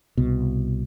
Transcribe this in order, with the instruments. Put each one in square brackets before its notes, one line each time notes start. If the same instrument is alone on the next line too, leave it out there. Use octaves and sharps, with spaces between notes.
[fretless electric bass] C2 B2